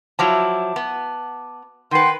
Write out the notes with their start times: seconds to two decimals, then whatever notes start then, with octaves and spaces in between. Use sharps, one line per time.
0.19 F3 F#3 E4 A5 D6
0.76 B3
1.91 D#3 B4 F#5 G5 C6